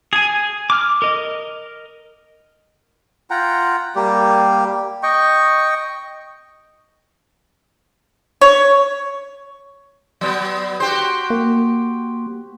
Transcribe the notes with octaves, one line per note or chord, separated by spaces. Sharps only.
G#4 G#5
D6 F6
A#4 D#5
F4 F#5 G5 A#5
G3 A#3 G4
D#5 G5 C#6
C#5
F#3 B3
F#4 G4 C5
A#3